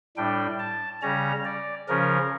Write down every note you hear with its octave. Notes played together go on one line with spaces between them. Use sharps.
A2 G3 D4 G5
A5
C#3 G3 C#4 A#5
D5
C#3 F3 C#4 A#4